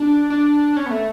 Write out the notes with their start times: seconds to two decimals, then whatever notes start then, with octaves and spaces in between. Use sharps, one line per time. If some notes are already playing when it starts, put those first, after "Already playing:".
Already playing: D4
0.30 D4
0.76 C#4
0.86 B3
0.91 A3